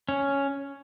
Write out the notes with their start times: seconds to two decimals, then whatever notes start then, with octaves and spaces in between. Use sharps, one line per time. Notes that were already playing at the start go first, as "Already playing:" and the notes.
0.09 C#4